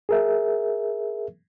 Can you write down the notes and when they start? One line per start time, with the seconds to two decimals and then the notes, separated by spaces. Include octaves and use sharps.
0.09 G#4 A#4 E5